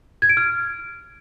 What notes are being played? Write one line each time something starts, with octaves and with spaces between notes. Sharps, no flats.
G#6
D7
F6